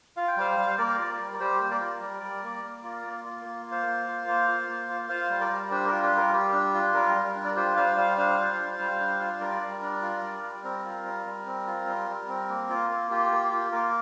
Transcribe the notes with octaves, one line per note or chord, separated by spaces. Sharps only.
F4 F5
G5
G3 C5 F5
G3
A#3 A#4 D5
F4
G3
A#4
G3 G4 C5
A#3
A#4 D5
F4
G3
G3
A#3
A#3
F4
A#3
F4
A#3
F4
C5 F5
A#3
F4
A#3
F4
A#3
F4
F4 C5 F5
G3
A#4 D5
G3
D4 G4 C5
F4 A#4
G4
G3
A#4
G3 G4
D4
F4
G3 A#4
G3
D4
D5
F4 G4 C5
G3 C5 F5
G3 C5 F5
D4 C5 F5
F4
G3
G3
D4
F4
G3 A#4 D5
G3
D4
F4
G3
G3
C4 A#4
F4
G3
G3
C4
F4
G3
G3
C4
A#3
F4
A#3
F4 G4
A#3
F4
A#3 A#4